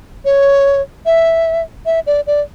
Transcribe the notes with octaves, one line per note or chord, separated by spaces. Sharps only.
C#5
E5
E5
D5
D5